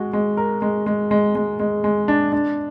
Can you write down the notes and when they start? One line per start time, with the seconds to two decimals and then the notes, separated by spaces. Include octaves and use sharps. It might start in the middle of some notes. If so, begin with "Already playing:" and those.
Already playing: G#3 F#4
0.13 G#3
0.37 A#4
0.62 G#3
0.86 G#3
1.11 G#3
1.35 G#3
1.60 G#3
1.84 G#3
2.08 D4
2.32 D4